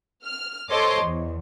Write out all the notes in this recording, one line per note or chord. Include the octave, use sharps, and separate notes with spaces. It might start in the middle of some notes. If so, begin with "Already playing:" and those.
F6
A4 C5 C#5 D#5 C6 D6
E2